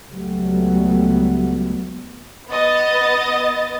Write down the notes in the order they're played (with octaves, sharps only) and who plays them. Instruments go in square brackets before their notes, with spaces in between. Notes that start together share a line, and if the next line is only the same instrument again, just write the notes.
[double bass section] C#2 F#3 G3 A3 B3
[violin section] B3 D#5 A6